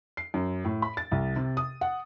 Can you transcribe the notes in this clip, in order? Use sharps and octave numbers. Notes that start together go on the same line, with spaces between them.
C7
F#2
A2
B5
A6
C2
C3
D#6
F#5